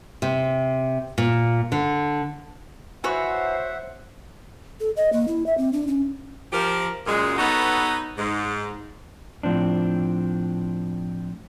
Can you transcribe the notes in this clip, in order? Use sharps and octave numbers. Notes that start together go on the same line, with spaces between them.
C3
A#2
D3
E3 F#4 C5 C#5 E5 F#5
A4
D#5
A#3
E4
E5
C4
D4
C#4
F3 G4 A#4
F#2 A#2 G#3
B3 D#4 F#4 A4 B4 C#5
G#2
A2 F3 C4 D4